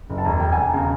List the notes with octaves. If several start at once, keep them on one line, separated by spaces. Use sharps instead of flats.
F#1
A5
E1 A#5
E1 G5
E1 G#5
A5
C#3 A#5